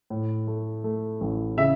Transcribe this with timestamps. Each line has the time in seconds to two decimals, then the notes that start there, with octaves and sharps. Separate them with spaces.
0.10 A2
0.47 A3
0.84 A3
1.21 A1
1.58 C#3 E5